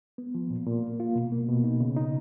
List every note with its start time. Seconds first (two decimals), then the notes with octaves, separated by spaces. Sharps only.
0.18 B3
0.35 F3
0.50 A#2
0.67 A#2
0.84 A#3
1.00 F4
1.15 B2
1.32 A#3
1.48 B2
1.64 D#4
1.80 C#3
1.96 D#4